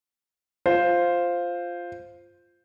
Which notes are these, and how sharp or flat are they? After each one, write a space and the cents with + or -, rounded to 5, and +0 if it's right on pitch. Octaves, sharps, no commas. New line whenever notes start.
F4 +0 C5 +0